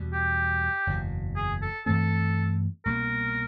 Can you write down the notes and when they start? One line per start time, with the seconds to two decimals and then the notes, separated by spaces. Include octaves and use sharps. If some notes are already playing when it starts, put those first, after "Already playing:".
Already playing: E2 B2 G3
0.13 G4
0.87 F#1 E2 B2
1.36 G#4
1.62 A4
1.86 G2 E3 A3 C4 A4
2.85 C2 B2 G3 A#3 A#4